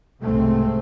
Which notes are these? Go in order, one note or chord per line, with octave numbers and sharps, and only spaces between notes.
C2 G#2 B2 A3 C4